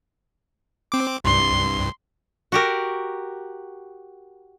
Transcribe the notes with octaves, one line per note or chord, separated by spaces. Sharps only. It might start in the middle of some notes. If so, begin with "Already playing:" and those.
C4 D6
C2 G2 C6
F#4 G4 A#4